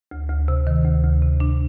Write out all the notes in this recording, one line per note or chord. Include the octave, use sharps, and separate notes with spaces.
D2
D2
C3
D#3
D2
D2
C3
D4